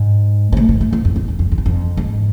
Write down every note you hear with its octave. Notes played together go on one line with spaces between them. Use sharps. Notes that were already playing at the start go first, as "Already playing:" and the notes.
Already playing: G#2
G#2
A2
B2
A2
G#2
F2
E2
E2
F2
F2
E2
F2
G#2